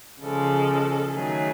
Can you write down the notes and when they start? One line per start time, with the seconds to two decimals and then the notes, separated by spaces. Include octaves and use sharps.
0.22 C#3 F3 G#3 A4
1.13 D#3 F#3 A3 G#4